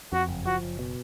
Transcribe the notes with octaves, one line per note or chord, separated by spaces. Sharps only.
F2 F#4
F#1
F3 F#4
F#1
B2